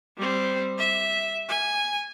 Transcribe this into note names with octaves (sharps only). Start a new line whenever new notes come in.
G3 C4
E5
G#5